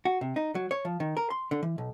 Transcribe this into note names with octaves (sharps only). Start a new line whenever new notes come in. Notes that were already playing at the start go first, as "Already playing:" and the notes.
F#4
C3
D#4
F#3
C#5
F3
D#3
A#4
C6
D3
E3
B1